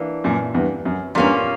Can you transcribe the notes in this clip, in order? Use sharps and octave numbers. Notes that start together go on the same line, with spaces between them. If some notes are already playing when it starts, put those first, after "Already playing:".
Already playing: E3 A#3 D4
F#2 A#2
E2 G2
F#2
E2 G2 A#2 A#3 C#4